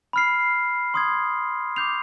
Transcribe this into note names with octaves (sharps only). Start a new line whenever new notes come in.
B5 F6 C7
C6 D#6 G#6
D6 G6 C7 F7